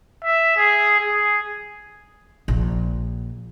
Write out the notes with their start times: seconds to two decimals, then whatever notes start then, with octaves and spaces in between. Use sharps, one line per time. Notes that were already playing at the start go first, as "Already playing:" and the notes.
0.24 E5
0.57 G#4
1.00 G#4
2.48 A#1